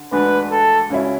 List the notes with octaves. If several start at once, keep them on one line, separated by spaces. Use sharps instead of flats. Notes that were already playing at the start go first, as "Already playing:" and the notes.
Already playing: D3
D2 D3 G#3 D4 B4
A4
C#2 C#3 F#3 C#4 E4